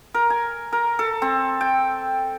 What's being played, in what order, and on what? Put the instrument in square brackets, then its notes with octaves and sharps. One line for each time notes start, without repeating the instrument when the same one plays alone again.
[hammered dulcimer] A#4
G#5
A#4
A4
C4
G5